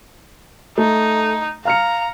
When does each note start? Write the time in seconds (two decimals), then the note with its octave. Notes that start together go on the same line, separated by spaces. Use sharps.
0.78 A3 D#4
1.65 F5 A#5 F6 C#7